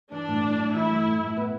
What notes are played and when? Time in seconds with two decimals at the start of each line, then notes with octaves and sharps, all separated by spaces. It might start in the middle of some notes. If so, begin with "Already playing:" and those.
0.11 E3 D4
0.28 A2
0.43 A2
0.58 A3
0.74 E3 E4
0.89 A3
1.05 A2
1.21 A2
1.37 B3